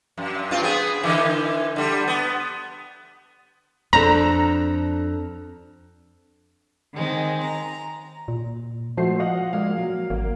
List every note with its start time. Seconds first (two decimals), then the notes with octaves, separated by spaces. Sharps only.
0.18 F#2
0.51 G2 C4 F4
0.62 B3 C4 G#4
1.01 D3 E3 C4
1.76 D3 G3
2.08 B3
3.93 F2 C4 D4 A4 A#5
6.93 D#3 G#3 C4
7.43 A#5
8.28 A#2
8.97 G#2 F3 A3 F#4 C5 C7
9.20 D#5 F5 F#5
9.53 G#3 A#3 D5 F5
9.77 F#3
10.10 G#1 A#3